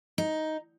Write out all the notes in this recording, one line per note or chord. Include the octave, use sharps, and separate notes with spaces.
D#4